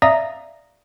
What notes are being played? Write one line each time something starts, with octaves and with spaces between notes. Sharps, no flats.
D5 E5 F5 A#5 D#6 A#6